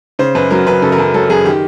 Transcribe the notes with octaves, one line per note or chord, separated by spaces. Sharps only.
C#3 C5
F#2 B4
F#3 A#4
F#2 B4
C#3 A4
A#4
F#2 A4
F#3 A4
F#2 G#4
D#3 G4